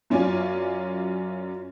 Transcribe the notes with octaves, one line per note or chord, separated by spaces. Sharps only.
F#2 C#4 F4 D5 G#5